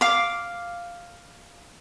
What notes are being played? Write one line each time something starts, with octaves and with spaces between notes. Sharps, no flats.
F5 D6